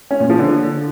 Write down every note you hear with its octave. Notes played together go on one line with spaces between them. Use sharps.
C#4
A#2
F3
D3